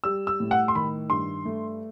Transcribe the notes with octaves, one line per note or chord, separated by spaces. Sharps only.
G3 E6
E6
A2
F#5
C6
D#3 B5
G2 C6
A3